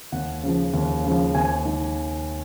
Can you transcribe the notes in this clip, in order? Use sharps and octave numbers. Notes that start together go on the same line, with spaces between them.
D#2 F#5
C#3 F3
D#2
C#3 F3
D#2 G#5
D#3